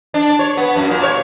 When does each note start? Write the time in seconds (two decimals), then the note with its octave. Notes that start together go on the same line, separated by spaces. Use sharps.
0.14 D4
0.39 C#5
0.57 B3
0.76 F#2
0.90 A#2
1.03 C#5